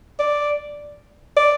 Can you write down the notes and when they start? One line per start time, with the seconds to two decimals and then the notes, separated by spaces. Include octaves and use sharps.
0.19 D5
1.37 D5